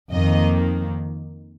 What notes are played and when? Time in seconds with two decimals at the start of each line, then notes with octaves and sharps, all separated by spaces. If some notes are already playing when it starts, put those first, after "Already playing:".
0.12 F2 D#3 A#3 D#5